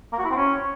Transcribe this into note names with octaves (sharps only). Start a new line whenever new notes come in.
A#3
F#4
E4
C4
C#4